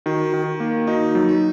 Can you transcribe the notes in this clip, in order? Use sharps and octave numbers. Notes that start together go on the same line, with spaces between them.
D#3 F#4
D#3
A#3
D#4 F#4
F#3
D#4